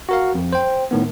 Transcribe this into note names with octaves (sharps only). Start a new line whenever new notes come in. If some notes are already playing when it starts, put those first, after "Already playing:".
F#4 A#4 F5
F2
C5 G5
A2 D#3 B3